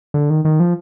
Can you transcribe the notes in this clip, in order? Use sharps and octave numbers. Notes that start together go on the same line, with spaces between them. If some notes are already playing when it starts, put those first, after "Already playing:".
D3
D#3
D#3
F3